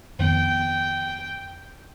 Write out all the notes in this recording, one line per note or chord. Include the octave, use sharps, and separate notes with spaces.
F2 D#3 B3 G5